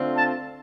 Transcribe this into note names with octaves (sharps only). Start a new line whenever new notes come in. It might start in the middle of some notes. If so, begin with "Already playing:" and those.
Already playing: D3 A3 C4 F4
A5